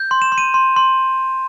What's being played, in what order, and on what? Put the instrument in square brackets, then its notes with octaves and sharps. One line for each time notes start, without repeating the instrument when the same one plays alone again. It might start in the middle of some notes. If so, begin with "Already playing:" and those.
Already playing: [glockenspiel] G6
C6
E7
C6
D#7
C6
C6